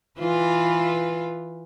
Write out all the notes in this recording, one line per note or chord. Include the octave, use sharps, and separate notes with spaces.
E3 F4 B4